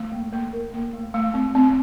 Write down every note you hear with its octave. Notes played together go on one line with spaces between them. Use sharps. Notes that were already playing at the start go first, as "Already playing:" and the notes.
Already playing: A3
A#3
A#3
A#4
A#3
A3
A3
C4
C4